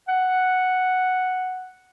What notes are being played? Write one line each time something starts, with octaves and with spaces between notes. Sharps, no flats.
F#5